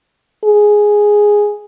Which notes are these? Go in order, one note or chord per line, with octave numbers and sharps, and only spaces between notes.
G#4